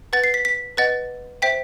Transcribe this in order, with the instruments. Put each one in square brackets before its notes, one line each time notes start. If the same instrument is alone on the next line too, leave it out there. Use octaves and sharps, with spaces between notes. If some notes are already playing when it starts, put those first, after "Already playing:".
[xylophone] B4 F#5 A6
C7
B6
B6
B4 D#5 F#5 A6
C5 E5 G5 B6